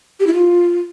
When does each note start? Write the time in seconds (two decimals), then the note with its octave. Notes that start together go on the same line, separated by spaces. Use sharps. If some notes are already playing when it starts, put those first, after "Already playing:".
0.20 G4
0.27 E4
0.34 F4